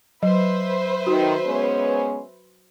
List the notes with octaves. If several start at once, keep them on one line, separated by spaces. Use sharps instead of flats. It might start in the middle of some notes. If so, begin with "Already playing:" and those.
F#3 B4 C5 E5
D#3 F#4
G#3 B3 C#4